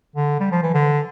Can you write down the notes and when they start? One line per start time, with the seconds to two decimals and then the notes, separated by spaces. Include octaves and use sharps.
0.16 D3
0.40 G3
0.52 F3
0.63 E3
0.74 D3